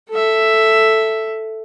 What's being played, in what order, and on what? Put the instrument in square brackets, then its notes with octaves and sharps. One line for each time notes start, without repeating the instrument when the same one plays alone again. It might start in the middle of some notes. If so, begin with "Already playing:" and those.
[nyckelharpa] A4 E5